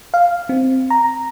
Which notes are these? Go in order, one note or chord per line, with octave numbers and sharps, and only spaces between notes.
F5
C4
A#5